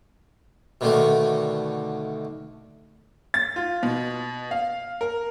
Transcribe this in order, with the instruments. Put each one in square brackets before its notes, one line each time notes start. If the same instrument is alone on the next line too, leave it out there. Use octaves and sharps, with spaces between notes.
[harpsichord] B2 D3 D#3 A3
[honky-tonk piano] A6
F4
B2
F5
A#4